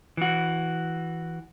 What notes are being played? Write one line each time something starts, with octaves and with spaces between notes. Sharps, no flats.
E3 F#4